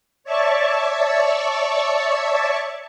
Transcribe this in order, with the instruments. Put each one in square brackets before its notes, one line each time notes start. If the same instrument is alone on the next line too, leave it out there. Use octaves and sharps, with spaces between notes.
[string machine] C#5 D5 E5 A5 C#6